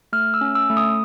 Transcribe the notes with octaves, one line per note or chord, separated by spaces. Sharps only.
A3 F6
E6
C#4
E6
A3
D#6